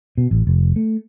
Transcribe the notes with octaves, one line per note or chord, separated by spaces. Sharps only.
B2
A1
F1
A3